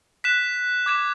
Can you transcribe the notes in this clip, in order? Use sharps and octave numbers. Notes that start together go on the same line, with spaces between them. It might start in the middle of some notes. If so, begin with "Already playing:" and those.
F#6 B6 E7
D6 G#6 B6 E7